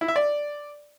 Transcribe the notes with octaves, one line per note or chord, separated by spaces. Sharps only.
E4
E5
D5